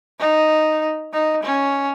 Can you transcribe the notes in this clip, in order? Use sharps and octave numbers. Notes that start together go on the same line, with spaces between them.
D#4
D#4
C#4